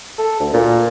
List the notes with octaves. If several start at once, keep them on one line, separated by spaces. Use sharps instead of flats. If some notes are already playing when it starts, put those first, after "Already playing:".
A4
D2
A#2